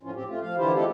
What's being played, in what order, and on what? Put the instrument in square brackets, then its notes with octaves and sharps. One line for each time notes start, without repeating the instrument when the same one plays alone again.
[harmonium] F2 A2 F3 C#4 F4
C4 G4
A3 F4
F3 F5
D3 E3 E4 F4 G4 C5
G#3 A3 C4 F4 G4 A4